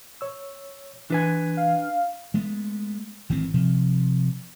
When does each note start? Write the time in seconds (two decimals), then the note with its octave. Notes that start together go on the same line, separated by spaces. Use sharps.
0.21 C#5 E6
1.10 E3 D4 B4 G#5 G#6
1.57 F5
2.34 G#3 A3 B3
3.29 G#1 D#3 E3 C4
3.54 C3 F3